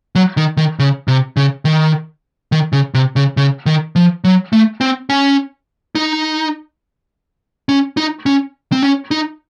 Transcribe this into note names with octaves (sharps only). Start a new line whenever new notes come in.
F#3
D#3
D#3
C#3
C3
C#3
D#3
D#3
C#3
C3
C#3
C#3
D#3
F3
F#3
A3
C4
C#4
D#4
C#4
D#4
C#4
C4
C#4
D#4